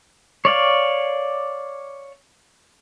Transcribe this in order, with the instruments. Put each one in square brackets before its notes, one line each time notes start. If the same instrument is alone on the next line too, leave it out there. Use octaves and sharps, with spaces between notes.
[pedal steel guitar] C#5 D5 F5